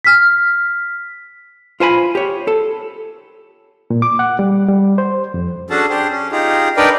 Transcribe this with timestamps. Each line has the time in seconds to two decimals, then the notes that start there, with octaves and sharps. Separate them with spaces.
0.04 F6 B6
1.80 F4 C5 G#5 B5
2.15 G4 C#5
2.47 A4
3.90 A#2
4.02 D6
4.19 F#5
4.39 G3
4.69 G3
4.98 C5
5.34 F2
5.70 C#4 D4 F#4 G#4 A4 A5
5.90 D4 G4 G#4 C5
6.11 C#4
6.32 D#4 F4 G4 G#4
6.77 D4 D#4 A#4 B4 D5 G5